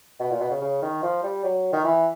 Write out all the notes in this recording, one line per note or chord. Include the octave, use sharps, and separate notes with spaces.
B2
A#2
B2
C#3
C#3
D#3
F3
G3
F#3
D#3
E3